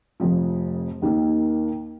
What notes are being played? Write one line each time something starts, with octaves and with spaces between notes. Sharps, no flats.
F1 F2 F3
D#2 D#3 A#3